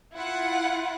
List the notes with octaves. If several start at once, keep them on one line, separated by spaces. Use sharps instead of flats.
E4 F4 F#5